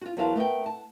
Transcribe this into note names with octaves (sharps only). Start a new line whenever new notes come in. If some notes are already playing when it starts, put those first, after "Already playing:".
F4 F#4
E2 F#3 A#4 C5 F5 A5
A3 B3 A#4 G5
F#5 A5